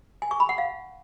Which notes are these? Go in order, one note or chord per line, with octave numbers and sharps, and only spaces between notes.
G#5
C#6
B5
F#5
F5